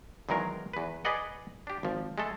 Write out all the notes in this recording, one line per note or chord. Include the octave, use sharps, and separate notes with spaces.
E2 D#3 F#3 G#3 A#4
E2 B4
G#4 B4 D5 D#5 F#5
D4 G4
G#1 F3
G#3 A3 A4